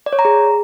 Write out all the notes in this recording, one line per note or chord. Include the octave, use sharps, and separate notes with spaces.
D5
C#5
A#5
G#4